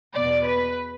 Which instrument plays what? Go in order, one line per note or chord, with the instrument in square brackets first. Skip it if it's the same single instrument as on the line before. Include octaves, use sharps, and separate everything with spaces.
[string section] E2 B2 D5
B4